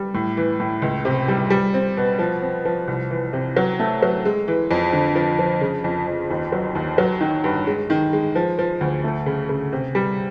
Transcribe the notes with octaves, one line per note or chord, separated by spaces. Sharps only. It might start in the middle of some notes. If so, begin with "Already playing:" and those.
Already playing: G3
A2
E3
A2
C#2
C3
G3
G3
C4
B2
F3
C4
F3
C2
E3
C3
F#3
A3
F#3
G#3
E3
F2
D3
F3
F3
C#3
F2
F2
D#2
F#3
D#2
F#3
D#3
G2
G#3
D#3
G#3
F3
F3
D2
A3
C#3
C#3
C3
G3